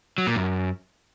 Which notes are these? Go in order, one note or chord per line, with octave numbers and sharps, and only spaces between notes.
F#3
A#2
F#2